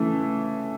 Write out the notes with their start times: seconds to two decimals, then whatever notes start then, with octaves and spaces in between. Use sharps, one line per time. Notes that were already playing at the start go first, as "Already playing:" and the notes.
Already playing: C#3 E3 A3